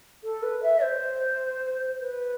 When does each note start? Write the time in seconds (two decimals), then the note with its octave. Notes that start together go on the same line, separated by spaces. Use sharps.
0.24 A4
0.43 B4
0.63 E5
0.83 C5
2.00 B4